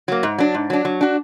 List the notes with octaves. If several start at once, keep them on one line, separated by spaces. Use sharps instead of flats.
F#3 A#3
G#2
F#3 D4
G#2
F#3 D4
F#3
D4 F#4